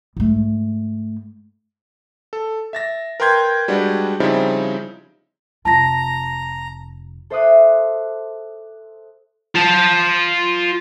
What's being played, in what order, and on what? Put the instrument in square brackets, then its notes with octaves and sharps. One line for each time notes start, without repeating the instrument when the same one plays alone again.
[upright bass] G#2 A3
[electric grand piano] A4
E5 A6 A#6
A#4 B4 G5 C6 G6 G#6
G3 G#3 D4 F#4 B4 D5
C#3 F3 G3 C4 D#4 E4
[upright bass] F1 F4 [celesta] A5 A#6 [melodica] A#5
[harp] A4 C5 E5 D6 D#6 F#6
[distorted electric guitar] F4 A5